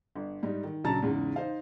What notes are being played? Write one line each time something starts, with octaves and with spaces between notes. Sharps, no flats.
G1
G#2 G3 D#4
D#3
A#1 C#3 F#3 A5 A#5 A6
E2 G#2 C#3
D#4 C5 F5